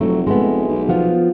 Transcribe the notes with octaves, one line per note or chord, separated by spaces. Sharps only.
F1 F#3 A3
G#3 A3 B3
B1
F3 B3 F4